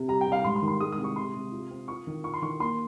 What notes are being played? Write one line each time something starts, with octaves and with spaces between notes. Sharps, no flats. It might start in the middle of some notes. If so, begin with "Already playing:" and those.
Already playing: C3
G3 A#5
G5
G3 F5
G#2 C6
C6
D#3
C6
G#3 D#6
D#6
C3
C#6
C3 C6
C3
F4
C4
F4 C#6
D#3
F4 C#6
C6
D#3 C#6
A#3 C6